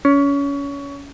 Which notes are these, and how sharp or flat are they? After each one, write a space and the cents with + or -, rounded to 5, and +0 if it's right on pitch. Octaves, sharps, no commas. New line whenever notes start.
C#4 +25